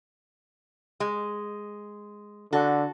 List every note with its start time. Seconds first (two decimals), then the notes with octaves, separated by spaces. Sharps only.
1.00 G#3
2.53 D3 F#4 A4